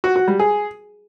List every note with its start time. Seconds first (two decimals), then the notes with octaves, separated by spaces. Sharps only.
0.04 F#4
0.16 F#4
0.28 G3
0.39 G#4